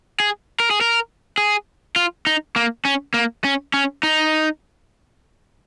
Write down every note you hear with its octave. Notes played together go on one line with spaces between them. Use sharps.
G#4
A#4
G#4
A#4
G#4
F4
D#4
A#3
C#4
A#3
C#4
C#4
D#4